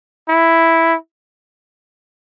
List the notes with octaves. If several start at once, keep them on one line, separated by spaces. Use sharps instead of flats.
E4